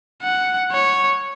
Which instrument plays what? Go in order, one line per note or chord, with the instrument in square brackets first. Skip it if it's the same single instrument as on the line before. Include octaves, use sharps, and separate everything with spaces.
[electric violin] F#5
C#5